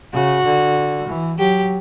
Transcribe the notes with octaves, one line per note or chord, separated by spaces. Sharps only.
C#3 F#4
D3
E3
F#3 G4